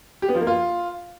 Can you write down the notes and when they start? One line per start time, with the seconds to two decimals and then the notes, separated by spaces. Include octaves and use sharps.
0.22 G4
0.29 B3
0.35 F3
0.41 A#3
0.47 F4